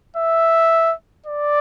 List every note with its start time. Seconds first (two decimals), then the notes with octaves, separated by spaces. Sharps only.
0.17 E5
1.26 D5